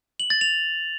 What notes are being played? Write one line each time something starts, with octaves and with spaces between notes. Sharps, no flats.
F#7
A6
F7